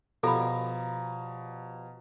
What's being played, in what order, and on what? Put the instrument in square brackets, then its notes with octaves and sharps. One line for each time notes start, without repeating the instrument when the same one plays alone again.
[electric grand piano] B2 A#5 [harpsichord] F3 G3 [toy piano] A4 B5